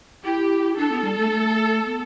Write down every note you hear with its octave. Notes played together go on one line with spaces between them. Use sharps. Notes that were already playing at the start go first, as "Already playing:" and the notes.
E4 G4
D4 A4
B3
G3
A3
A3
B3